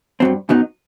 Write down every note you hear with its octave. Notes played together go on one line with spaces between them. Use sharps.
G2 F#3 C4
F#2 F#3 B3 D#4